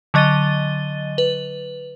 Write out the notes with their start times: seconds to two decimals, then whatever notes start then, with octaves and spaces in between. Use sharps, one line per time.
0.14 D3 F#3 D#5 A6 D#7 G7
1.18 B4